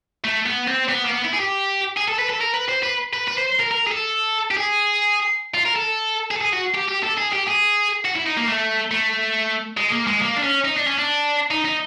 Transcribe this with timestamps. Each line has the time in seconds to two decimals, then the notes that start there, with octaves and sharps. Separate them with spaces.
0.24 A3
0.46 B3
0.67 C4
0.89 B3
1.04 A#3
1.10 B3
1.24 E4
1.33 G#4
1.39 G4
1.97 G#4
2.08 A4
2.19 B4
2.30 A4
2.41 A#4
2.54 B4
2.69 C5
2.83 B4
3.13 B4
3.28 B4
3.37 C5
3.59 A#4
3.71 A#4
3.87 G#4
3.92 A4
4.51 G4
4.57 G#4
5.54 F4
5.66 A#4
5.76 A4
6.31 G#4
6.36 A4
6.41 G#4
6.53 F#4
6.74 G4
6.88 G4
7.03 A4
7.17 G#4
7.32 G4
7.47 G#4
8.05 F#4
8.15 E4
8.26 D#4
8.37 A#3
8.48 A3
8.91 A3
9.77 G#3
9.92 A#3
10.07 G#3
10.22 A#3
10.36 D4
10.43 C#4
10.64 D#4
10.77 D4
10.87 C#4
10.98 D4
11.51 D#4
11.65 D#4